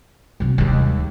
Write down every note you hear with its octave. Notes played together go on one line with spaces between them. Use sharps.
C3 F#3
D#2 G#3